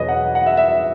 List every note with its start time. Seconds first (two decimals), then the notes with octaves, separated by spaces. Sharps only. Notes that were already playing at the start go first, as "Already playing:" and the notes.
Already playing: E2 B2 F#3 G#4 B4 C#5 D#5
0.09 F#5
0.35 F#5
0.46 E5
0.57 E5
0.68 E5